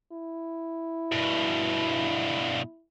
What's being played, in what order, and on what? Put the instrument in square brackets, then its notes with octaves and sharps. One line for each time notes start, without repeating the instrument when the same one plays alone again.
[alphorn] E4
[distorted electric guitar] G2 B2